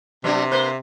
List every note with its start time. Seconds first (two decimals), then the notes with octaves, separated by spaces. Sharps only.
0.24 C3 F#3 B3 D4
0.51 A#3 B4 C5